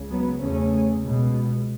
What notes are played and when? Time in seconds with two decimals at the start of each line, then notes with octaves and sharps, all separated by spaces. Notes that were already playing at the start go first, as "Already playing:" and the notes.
Already playing: C#2 C#3
0.11 F#3 B3
0.40 E2 C#3 A3 C#4
0.99 C#2 B2